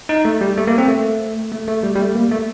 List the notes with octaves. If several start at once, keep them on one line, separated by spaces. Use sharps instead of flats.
D#4
A3
G3
A3
A#3
C4
A3
A3
A3
G3
G3
A3
A#3
A3